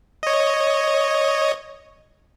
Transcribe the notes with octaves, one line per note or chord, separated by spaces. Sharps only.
C#5 D#5